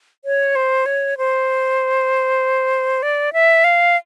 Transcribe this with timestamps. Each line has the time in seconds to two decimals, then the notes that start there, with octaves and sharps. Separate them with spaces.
0.25 C#5
0.56 C5
0.86 C#5
1.18 C5
3.03 D5
3.33 E5
3.64 F5